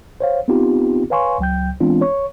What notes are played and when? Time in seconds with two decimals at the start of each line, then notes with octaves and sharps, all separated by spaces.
0.20 C5 C#5 F5
0.48 B3 C4 D#4 F4 G4
1.10 B4 C#5 F5 G#5 C6 C#6
1.39 C#2 F#3 G5 G6
1.81 E3 G#3 B3 C4 D4 F4
2.01 C#5 C#6